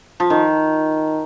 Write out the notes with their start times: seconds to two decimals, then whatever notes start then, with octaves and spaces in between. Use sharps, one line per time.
0.20 F3
0.30 D#3